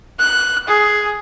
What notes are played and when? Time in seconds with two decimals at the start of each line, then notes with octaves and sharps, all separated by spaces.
0.20 F#6
0.68 G#4